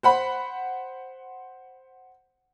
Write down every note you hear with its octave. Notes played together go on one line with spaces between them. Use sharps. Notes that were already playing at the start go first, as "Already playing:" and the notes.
C5 F#5 B5